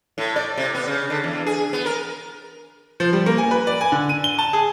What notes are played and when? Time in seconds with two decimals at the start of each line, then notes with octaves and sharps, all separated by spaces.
0.18 A2
0.36 D5
0.57 C3
0.75 B3
0.87 C#3
1.10 D3
1.24 E2
1.46 G#4
1.73 B3
1.86 A#4
3.00 F3
3.13 G3
3.26 A#3
3.38 G#5
3.51 B4
3.67 D5
3.81 G#5
3.92 D3
4.09 D#7
4.24 G7
4.38 A5
4.53 G#4